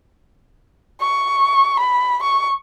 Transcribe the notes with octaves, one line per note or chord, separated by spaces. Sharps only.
C#6
B5
C#6